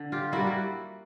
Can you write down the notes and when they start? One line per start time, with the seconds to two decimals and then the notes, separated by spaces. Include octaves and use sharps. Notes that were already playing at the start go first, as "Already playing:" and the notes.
Already playing: D3
0.12 F4 G4
0.32 G3 A#3 E4 F#4
0.47 F#4